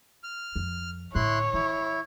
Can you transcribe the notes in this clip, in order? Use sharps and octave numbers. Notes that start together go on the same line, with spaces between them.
F6
F2
A2 D3 E4 C#5 C6 F#6
E3 E4